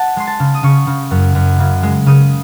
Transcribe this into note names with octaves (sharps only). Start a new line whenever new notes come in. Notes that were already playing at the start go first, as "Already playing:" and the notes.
Already playing: F#5 A5
G#3 C6
A5
C#3
D#6
C#3 C#6
C#3
F#2
F#2
C#3
G#3
C#3 D#6